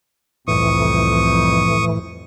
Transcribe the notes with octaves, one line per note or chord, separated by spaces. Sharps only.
C2 F2 A2 E3 C#6 D#6